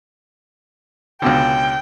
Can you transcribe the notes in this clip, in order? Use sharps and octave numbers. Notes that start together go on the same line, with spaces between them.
C#2 B2 D3 G5